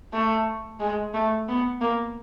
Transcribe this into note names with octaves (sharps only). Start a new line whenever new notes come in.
A3
G#3
A3
B3
A#3